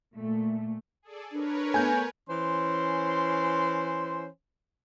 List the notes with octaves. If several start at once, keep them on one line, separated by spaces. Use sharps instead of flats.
A#2 A3
G#4 A4 D5
D4 A#4 B4 C#5
A3 B3 G#5 G6
E3 C#4 C5 C6